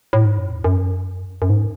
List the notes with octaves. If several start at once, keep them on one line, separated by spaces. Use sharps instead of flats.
A2
G#2
F#2
E2
F#2
F#2
G#2